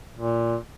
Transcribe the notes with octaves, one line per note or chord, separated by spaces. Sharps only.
A#2